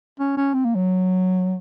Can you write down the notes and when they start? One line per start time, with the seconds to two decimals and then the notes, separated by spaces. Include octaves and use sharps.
0.20 C#4
0.37 C#4
0.54 C4
0.65 A#3
0.75 F#3